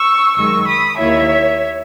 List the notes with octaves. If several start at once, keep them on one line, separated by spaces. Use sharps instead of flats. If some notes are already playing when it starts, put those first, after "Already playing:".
Already playing: C#6 E6
F#2 D#3 G#3 C#6 E6
B5 D#6
D#2 D#3 A#3 E4 C#5 E5